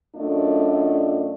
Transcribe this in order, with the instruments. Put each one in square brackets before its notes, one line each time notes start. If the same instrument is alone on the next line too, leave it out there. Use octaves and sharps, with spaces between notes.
[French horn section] F#2 A3 D4 F4 D5 D#5